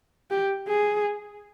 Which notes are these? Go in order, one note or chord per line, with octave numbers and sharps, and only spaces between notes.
G4
G#4